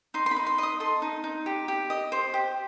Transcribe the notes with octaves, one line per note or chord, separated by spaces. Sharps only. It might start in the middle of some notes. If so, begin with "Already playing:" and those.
D#4 C6
C6
B5
D#4
C6
D#5 D#6
A4 C6
D#4
D#4
G4
G4
D#5
C5
G4